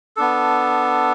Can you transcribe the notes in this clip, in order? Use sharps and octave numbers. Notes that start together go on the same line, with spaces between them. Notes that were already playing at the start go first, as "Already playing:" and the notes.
B3 D4 A4